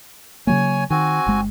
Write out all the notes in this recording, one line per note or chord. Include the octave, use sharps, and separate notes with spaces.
C#3 F#3 A#3 C#5 G#5
D#3 C4 F#4 G#5
G1 G#3